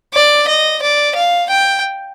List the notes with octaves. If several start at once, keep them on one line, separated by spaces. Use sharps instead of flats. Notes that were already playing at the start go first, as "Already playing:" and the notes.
D5
D#5
D5
F5
G5